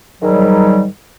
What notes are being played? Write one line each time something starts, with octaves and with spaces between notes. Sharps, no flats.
G#2 D#3 F#3 G3